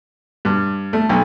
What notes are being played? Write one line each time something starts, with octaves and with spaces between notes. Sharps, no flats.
G2
A3
B1